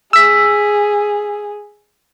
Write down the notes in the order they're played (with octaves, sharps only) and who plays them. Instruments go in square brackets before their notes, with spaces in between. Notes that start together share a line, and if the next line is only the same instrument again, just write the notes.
[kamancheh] G#4 [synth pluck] E6 B6